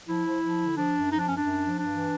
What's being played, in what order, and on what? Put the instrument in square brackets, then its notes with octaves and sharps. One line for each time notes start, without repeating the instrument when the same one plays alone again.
[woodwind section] F3 E4
F3
F3
D3
F3 D4
F#2
F3 D#4
D4
F#2 C#4
D4
F#2
F3
G2 D4
E3